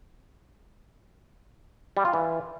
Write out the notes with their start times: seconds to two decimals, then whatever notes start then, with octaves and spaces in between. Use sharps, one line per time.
1.97 G3
2.05 F4
2.13 E3